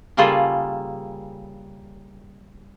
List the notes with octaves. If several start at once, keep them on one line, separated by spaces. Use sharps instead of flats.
C#3 G3 A#3 F4 G#4 A4